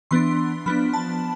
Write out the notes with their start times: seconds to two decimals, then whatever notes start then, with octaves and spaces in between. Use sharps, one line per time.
0.11 E3 B3 D4 C6
0.66 F3 B3 D4 B5
0.94 A5